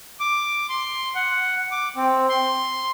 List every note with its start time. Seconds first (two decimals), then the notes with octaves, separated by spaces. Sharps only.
0.20 D6
0.69 C6
1.15 F#5
1.71 D6
1.97 C4
2.30 C6